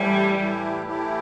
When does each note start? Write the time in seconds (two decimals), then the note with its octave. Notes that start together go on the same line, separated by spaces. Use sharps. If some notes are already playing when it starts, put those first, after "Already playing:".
Already playing: A2 E3 G3 A3 E4 G4
0.33 A2 E3 A3 E4 G4
0.86 A2 E3 A3 E4 G4